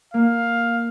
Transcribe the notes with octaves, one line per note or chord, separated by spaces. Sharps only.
A#3 F5